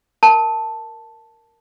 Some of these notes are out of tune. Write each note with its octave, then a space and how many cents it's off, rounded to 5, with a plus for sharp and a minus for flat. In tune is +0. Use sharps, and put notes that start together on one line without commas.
A#4 +0 A5 +0